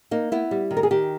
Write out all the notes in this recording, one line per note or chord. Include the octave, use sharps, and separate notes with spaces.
A#3 D#4
B3 E4
G3
D#3
A#4
G#4
D#3 G4